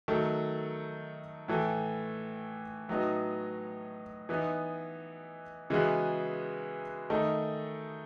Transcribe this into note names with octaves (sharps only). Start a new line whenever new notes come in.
D#3 F#3 A3
A2 E3 A3
A2 F#3 B3 D#4
E3 B3 D#4
C#3 E3 G#3 B3 F#4
D#3 A3 D#4